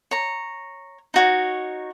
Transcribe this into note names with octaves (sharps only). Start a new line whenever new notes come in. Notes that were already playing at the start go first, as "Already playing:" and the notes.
C#5 A#5
D#4 F#4 C#5